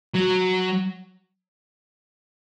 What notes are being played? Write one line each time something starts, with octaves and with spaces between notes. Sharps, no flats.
F#3